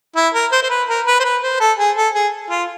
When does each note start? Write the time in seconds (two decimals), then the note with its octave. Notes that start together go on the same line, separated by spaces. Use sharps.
0.16 E4
0.34 A#4
0.52 C5
0.63 C5
0.70 B4
0.89 A#4
1.06 B4
1.20 C5
1.24 B4
1.42 C5
1.60 A4
1.79 G#4
1.96 A4
2.15 G#4
2.50 F4